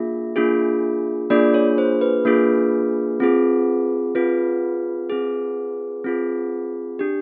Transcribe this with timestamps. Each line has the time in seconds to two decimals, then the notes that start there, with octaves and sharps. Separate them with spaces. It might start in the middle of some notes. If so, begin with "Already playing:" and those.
Already playing: A#3 D4 F4 G#4 E5
0.36 A#3 D4 F4 G#4
1.30 A#3 D4 F4 G#4 D5
1.54 C#5
1.78 C5
2.01 B4
2.25 A#3 D4 F4 G#4
3.20 C4 F4 G#4
4.15 C4 F4 G#4 B4
5.10 C4 F4 G#4
6.04 C4 F4 G#4
6.99 D4 G4